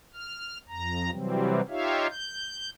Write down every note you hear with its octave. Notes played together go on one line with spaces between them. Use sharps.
F6
F2 A#5
C3 E3 F#3 G3 C4
D#4 F4 G4 C#5 E5 F5
G6